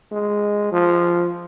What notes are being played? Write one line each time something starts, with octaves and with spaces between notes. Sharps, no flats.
G#3
F3